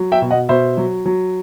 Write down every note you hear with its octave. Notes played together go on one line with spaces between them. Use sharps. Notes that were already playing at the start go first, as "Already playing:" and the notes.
Already playing: F#3
E5 G5
B2
D#5 F#5
B2 C5 E5
F#3
F#3